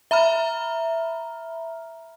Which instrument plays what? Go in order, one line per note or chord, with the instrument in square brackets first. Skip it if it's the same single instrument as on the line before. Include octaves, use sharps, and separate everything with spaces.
[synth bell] E5 A#5 B5 F6